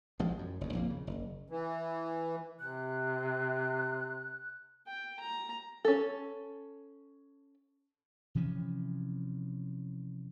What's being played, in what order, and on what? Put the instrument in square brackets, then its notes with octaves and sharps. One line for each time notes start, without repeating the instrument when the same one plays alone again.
[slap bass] A1 F3 G#3
F#2
F#1 E2
A#1 F2 A#3
C#3
F#1
[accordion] E3
[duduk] C3 [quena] F#6
[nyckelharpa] G5
A#5
[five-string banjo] C#4 A4
[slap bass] C3 E3 F3 C#4